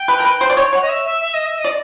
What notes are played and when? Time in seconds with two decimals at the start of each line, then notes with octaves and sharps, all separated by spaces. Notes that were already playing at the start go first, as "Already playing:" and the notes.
Already playing: G5
0.08 B4
0.20 A#4
0.25 B4
0.41 C5
0.50 D5
0.57 C#5
0.73 C#5 F#5
0.82 D#5
0.89 E5
1.05 E5
1.21 E5
1.34 D#5
1.46 E5
1.58 D#5
1.65 D5